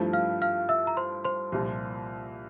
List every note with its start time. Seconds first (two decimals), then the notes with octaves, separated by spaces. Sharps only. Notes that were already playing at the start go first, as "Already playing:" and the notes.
Already playing: G2 F3 A3 E4
0.13 F5 F6
0.42 F5 F6
0.69 E5 E6
0.87 A#5
0.97 C5 C6
1.24 C5 C6
1.52 C2 A#2 F3